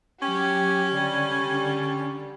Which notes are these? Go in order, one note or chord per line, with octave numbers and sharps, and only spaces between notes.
F#3 C#4 G4
D3 G3